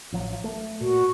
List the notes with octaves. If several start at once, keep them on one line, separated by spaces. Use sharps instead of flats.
A1 F3 F#3
A3
A#2 F#4